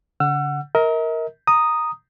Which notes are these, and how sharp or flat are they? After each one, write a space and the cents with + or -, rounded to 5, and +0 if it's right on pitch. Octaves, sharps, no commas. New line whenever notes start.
D3 -45 F#5 -5 E6 +35
A#4 +0 D#5 +45
A#5 +0 D#6 -5